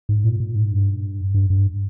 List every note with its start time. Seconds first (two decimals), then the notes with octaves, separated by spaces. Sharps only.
0.09 G#2
0.24 A#2
0.40 A#2
0.55 G#2
0.72 G2
1.34 G2
1.50 G2